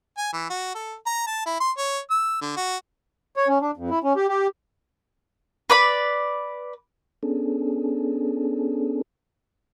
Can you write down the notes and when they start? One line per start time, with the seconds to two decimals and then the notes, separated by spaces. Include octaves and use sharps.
0.18 G#5
0.33 E3
0.50 F#4
0.75 A4
1.06 A#5
1.27 A5
1.46 E4
1.60 C6
1.78 C#5
2.10 E6
2.41 D3
2.56 F#4
3.36 C#5
3.48 C#4
3.61 D4
3.77 F2
3.90 E4
4.04 C#4
4.16 G4
4.29 G4
5.70 B4 D5 B5
7.23 B3 C#4 D4 G#4 A4